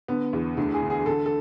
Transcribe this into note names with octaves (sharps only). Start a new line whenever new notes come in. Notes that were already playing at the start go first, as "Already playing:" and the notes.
D3 B3
E2
D2 D4
G#4
D3
G#4
D3 A4
A4